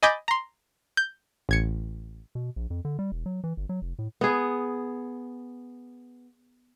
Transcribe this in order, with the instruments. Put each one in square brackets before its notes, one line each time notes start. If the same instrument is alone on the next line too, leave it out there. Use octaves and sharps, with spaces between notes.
[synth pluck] D#5 G#5 B5 D6 G6 A6
A#5 C6
G6
A1 G#6 C#7
[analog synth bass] B2
A#1
F2
D3
G3
E1
F#3
E3
G1
F#3
F1
A2
[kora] B3 G#4